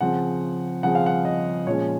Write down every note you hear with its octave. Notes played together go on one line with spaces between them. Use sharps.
C#3 F3 C4 F#5
C#3 F3 C4 F#5
F5
F#5
D#5
A#2 F3 G#3 C#4 C#5